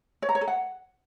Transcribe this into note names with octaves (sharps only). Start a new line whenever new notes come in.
C#5
A#5
C#5
A4
F#5